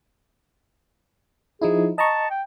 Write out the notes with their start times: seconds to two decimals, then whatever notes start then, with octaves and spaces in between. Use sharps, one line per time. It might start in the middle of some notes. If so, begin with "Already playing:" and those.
1.62 F3 D#4 E4 G#4
1.98 D#5 A5 A#5 C#6
2.30 G5